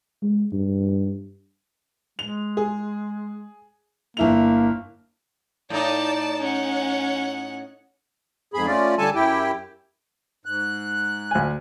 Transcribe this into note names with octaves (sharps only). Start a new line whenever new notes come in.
G#3
G2
G#3 F7
G#4
G1 A#3 E4 F7
A2 D#4 D5 A5
C#4 F#5
F2 G#2 G#4 B5
A3 C#4 F4 D5
D3 G3 A4 G#5 A5
F#2 E4 G4 G5
G#2 F#6
D2 G#5